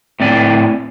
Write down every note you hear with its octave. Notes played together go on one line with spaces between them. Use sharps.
A2 C4 D5 G#5